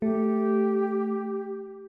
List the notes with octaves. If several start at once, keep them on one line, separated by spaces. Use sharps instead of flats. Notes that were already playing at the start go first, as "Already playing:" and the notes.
A3 G4